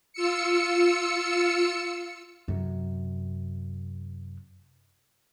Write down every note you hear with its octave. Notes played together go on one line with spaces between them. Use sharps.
F4 E6 C#7
F#2 C3